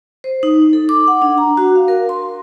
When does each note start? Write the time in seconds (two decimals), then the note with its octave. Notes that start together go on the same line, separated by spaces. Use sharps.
0.24 C5
0.43 D#4
0.73 A4
0.89 D6
1.08 F#5
1.22 D4
1.38 A#5
1.57 F#4
1.76 F5
1.88 A#4
2.09 C6